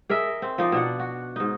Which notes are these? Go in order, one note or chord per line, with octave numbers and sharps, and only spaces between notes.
G#4 A#4 D#5 E5
C4
F3 D#4 D5
B2 D4 F#5
F#4
G#2 D#4